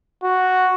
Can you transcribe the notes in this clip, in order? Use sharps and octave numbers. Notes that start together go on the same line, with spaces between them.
F#4